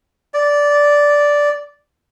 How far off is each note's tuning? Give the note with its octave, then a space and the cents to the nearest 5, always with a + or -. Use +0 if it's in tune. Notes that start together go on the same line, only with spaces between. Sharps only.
D5 -10